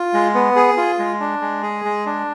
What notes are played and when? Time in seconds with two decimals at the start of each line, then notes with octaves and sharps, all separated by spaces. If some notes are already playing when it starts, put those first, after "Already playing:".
Already playing: F4
0.14 G#3
0.35 B3
0.56 G#4
0.77 F4
0.99 G#3
1.20 D4
1.41 G#3
1.63 G#4
1.85 G#3
2.06 D4